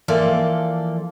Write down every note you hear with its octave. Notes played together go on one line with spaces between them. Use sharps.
E3 F3 A#3 A4 D5